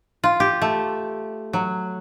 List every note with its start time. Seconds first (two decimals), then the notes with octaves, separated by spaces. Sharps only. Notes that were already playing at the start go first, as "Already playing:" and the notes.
0.24 F4
0.40 G4
0.62 A3
1.53 F#3